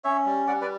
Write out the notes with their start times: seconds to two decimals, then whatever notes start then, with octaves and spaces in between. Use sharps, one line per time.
0.04 C#4 C#5 E5
0.26 G3
0.47 G3 D5 F#5
0.61 B4 D5